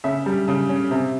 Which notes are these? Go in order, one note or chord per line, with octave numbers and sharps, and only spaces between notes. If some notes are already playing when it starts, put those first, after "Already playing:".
C#3 E5
G3
C#3
C#4
C3